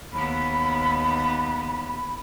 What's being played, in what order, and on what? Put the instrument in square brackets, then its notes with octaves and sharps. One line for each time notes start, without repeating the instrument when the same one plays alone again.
[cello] D#2 B3 [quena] B5